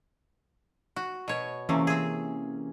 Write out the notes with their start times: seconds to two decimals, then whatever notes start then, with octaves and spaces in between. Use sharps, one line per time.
0.96 F#4
1.28 B2 C#5
1.69 C3 E3 A3 A#3 C#4
1.87 C4 G#4